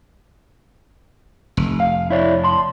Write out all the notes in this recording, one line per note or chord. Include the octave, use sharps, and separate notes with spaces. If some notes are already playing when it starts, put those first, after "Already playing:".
F1
F5
E4 C#5 D5
A5 C6